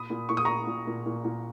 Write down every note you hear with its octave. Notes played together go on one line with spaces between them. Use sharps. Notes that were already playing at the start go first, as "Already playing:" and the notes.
Already playing: A#2 B5 D#6
A#2
A#2 C#6
D#6
A#2 A#5 C#6
A#2
A#2
A#2
A#2